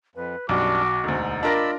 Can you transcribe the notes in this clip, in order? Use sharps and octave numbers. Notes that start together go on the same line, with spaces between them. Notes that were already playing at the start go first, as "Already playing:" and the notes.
F2 B4
B1 F#2 G3 D4 F#4 D6
E1 D2 D#4
D4 F4 A#4 D5 D#5 B5 E6 A#6